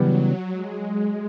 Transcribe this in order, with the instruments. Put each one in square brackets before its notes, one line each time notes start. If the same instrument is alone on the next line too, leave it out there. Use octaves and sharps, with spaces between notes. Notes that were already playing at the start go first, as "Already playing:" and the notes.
Already playing: [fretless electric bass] C#3 E3 G3 B3 [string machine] F#3
[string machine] G#3